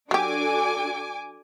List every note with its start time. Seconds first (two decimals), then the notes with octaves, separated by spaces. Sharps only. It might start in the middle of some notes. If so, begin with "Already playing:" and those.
0.11 F#3 D4 F#4 G4 A4 G#5 D6